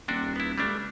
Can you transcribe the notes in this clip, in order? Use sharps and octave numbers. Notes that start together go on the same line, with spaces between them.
D#1 C3 D4 F#4
B3 E4
C#2 G3 A3 D4